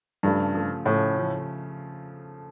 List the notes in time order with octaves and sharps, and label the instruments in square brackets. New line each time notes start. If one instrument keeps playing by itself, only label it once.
[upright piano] G2 [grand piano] C#3 F3 A3
[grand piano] C#3 F3 A3
[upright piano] A2 [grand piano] C#3 F3 A3
[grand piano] C#3 F3